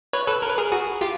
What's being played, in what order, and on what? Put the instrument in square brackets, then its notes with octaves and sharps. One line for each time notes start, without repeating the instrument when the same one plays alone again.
[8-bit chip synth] B4 C#5
A4 B4
A#4
B4
G#4 A#4
F#4 G#4
F4 G4